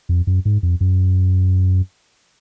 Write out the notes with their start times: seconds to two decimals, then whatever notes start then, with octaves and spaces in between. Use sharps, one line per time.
0.09 F2
0.27 F#2
0.45 G#2
0.63 F2
0.81 F#2